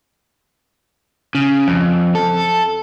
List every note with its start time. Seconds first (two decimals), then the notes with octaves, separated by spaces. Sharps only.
1.35 C#3
1.68 F2
2.15 A4